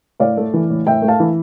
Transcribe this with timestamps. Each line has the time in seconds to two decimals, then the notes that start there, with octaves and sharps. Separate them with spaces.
0.20 A2 D5 F5
0.37 A3
0.54 E3
0.70 A2
0.87 A2 E5 G5
1.02 A3
1.08 F5 A5
1.20 E3